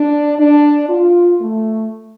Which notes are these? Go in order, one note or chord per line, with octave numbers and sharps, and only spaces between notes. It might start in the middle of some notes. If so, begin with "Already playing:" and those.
Already playing: D4
D4
F4
A3